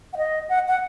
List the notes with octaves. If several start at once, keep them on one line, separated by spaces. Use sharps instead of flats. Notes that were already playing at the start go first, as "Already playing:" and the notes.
F#5
D#5
F#5
F#5